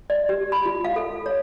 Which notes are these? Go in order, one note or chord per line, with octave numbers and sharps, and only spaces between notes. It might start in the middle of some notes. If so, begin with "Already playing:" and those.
D5
G4
B5
F4
F5
A4
C#5